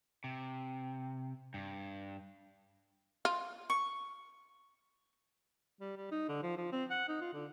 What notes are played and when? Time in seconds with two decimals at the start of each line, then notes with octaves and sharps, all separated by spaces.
0.24 C3
1.54 G2
3.25 F4
3.70 C#6
5.81 G3
5.97 G3
6.11 D#4
6.29 D3
6.43 F3
6.58 F3
6.72 C4
6.90 F#5
7.09 D#4
7.21 F4
7.33 D3